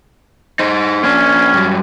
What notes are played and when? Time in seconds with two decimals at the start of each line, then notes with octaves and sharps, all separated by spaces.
0.59 D#4 C5
1.04 A#3 C#4 D4
1.53 G2 F#3